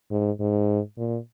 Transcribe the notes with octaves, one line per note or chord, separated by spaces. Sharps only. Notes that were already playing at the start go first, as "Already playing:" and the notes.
G#2
G#2
A#2